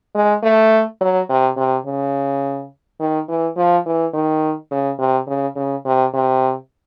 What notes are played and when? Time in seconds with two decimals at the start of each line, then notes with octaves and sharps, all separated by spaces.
0.15 G#3
0.43 A3
1.01 F#3
1.30 C3
1.57 C3
1.86 C#3
3.00 D#3
3.28 E3
3.57 F3
3.86 E3
4.14 D#3
4.71 C#3
4.99 C3
5.27 C#3
5.56 C#3
5.85 C3
6.14 C3